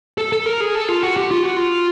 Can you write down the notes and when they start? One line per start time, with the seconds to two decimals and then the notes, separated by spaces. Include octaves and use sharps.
0.18 A4
0.32 A4
0.46 A#4
0.60 G#4
0.75 A4
0.88 F4
1.03 F#4
1.17 G4
1.31 F4
1.44 F#4
1.56 F4